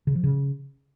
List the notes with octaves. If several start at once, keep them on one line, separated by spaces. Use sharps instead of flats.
C#3
F3
C#3